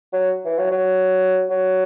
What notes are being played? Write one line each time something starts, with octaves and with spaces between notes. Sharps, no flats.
F#3
E3
F#3
F#3
F#3